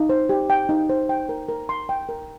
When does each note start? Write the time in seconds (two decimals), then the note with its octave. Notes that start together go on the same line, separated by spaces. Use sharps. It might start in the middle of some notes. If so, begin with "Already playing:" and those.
Already playing: D#4
0.09 C5
0.29 G4
0.50 G5
0.69 D#4
0.89 C5
1.09 G5
1.29 A#4
1.49 A#4
1.69 C6
1.89 G5
2.09 A#4